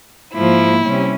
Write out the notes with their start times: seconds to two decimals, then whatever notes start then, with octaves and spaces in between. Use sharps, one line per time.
0.34 G#2 F3 A#3 E4
0.83 C3 G3 C#4